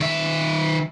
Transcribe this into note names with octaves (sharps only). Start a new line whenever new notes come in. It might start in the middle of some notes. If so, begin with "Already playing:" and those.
D#3 E5